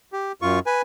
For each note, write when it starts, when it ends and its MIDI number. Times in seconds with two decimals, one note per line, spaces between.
0.13 0.32 67
0.42 0.59 42
0.42 0.59 65
0.42 0.59 85
0.66 0.82 71
0.66 0.82 80